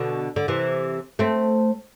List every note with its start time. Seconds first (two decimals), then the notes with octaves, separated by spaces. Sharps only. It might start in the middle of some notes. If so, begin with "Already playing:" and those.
Already playing: B2 D3
0.36 D3
0.48 C3 E3
1.19 A3 C4